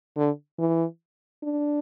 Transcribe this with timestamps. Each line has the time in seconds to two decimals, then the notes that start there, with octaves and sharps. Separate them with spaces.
0.17 D3
0.59 E3
1.43 D4